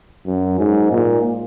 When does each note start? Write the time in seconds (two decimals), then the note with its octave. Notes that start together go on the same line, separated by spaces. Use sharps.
0.26 F#2
0.59 G#2
0.91 A#2